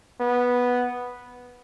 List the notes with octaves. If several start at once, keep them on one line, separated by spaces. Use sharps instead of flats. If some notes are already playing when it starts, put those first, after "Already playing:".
B3